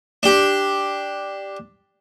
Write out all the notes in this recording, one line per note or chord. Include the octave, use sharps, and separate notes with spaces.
D4 G4